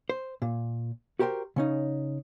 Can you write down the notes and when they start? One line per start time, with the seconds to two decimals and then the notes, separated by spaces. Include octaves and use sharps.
0.10 C5
0.42 A#2
1.19 F#4 G4 A#4 C5 G5
1.56 C#3 C#4 D#4